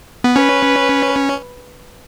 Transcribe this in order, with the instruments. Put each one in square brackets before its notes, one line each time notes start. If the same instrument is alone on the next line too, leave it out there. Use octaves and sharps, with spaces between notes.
[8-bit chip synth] B3
[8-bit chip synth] C#4 [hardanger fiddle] B4